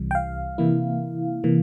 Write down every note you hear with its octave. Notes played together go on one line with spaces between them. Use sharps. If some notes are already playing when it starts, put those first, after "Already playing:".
Already playing: C2 C3 E3 G3
G5
F5
C3 E3 A#3 E4
C3 E3 A#3